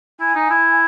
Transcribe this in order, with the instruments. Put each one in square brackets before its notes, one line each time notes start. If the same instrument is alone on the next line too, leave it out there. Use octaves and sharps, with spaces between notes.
[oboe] E4 [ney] G#5
[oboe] D#4
E4